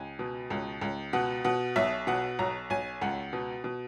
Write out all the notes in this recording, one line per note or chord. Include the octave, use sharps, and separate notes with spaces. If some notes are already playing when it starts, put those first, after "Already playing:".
Already playing: C#2 G#5
B2
C#2
C#2
B2 F#5
B2 F#5
B1 E5
B2 F#5
B1 A#5
B1 G#5
C#2 F#5
B2
B2